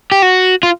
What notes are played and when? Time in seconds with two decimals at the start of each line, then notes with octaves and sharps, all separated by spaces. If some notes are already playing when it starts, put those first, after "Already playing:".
0.12 G4
0.22 F#4
0.63 F4